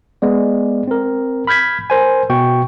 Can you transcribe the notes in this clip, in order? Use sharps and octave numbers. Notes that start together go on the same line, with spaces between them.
G#3 B3 D5
C4 A#4
B5 F6 G6 G#6 B6
A#4 C5 G#5
B2 G5 C#6